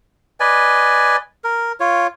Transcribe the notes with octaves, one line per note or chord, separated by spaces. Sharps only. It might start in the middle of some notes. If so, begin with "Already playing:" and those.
B4 D5 D#5 G#5
A#4
F4 C#5